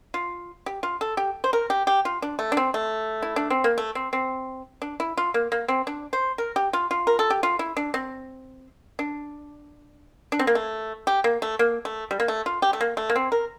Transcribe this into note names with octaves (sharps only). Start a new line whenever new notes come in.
F4
G4
F4
A4
G4
C5
A#4
G4
G4
F4
D4
A3
D4
C4
A3
E4
D4
C4
A#3
A3
C4
C4
D4
E4
F4
A#3
A#3
C4
D4
C5
A#4
G4
F4
F4
A#4
A4
G4
F4
E4
D4
C4
D4
D4
C4
A#3
A3
G4
A#3
A3
A#3
A3
G3
A#3
A3
F4
G4
A3
A#3
A3
A#3
C4
A#4